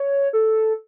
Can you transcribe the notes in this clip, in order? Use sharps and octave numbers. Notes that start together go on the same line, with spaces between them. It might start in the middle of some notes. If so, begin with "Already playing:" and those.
Already playing: C#5
A4